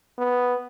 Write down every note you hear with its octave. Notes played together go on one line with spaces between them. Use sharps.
B3